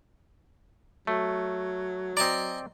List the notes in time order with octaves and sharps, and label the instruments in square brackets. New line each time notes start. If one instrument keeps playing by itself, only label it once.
[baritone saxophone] F#3 [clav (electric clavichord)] A3
[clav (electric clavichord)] C4 D5 [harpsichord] D#5 G#5 A#5